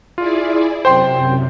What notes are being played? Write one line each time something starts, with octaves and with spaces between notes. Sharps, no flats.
E4 F4 G#4 D5
F#2 C3 C5 G5 C6